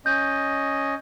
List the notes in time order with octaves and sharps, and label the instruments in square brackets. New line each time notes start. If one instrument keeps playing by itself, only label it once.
[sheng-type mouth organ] C#4 D#5 [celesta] G6